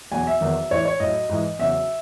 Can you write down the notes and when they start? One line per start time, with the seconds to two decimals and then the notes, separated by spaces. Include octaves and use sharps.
0.12 E2 B2 F#3 G#5
0.27 E5
0.41 E2 D#3 F#3
0.70 A2 E3 C#5
0.85 C#5
1.00 A2 F#3 D#5
1.29 G#2 E3
1.59 E2 C#3 F#3 E5